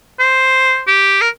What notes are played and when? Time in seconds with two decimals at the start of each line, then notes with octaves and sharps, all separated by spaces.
0.20 C5
0.88 G4
1.21 A#4